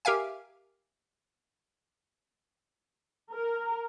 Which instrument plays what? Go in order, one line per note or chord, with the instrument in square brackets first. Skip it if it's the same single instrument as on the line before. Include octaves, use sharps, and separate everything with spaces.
[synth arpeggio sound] G4 A#4 E5 F5 G#5
[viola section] A#4